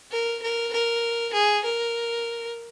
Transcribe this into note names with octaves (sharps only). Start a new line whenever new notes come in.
A#4
A#4
A#4
G#4
A#4